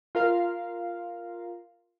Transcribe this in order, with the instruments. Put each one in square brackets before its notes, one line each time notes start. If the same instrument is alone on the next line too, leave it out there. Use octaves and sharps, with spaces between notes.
[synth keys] F4 A#4 F5